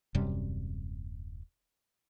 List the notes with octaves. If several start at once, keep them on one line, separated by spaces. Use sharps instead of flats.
D#1 F#2 C3 G3